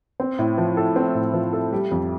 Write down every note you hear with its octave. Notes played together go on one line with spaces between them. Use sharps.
C4
A2
F3
A4
C4
A2
F3
A4
G3
F2